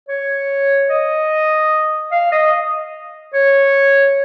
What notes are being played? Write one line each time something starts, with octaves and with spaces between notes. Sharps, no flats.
C#5
D#5
F5
D#5
C#5